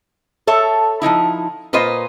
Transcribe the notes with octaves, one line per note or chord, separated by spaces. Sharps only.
A4 C#5 E5
F3 A#3 D#4 E4
A#2 F4 B4 C5 D#5